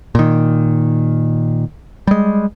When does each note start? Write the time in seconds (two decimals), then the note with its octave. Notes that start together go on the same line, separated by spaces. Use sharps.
0.15 A#2 D#3
2.07 G3 G#3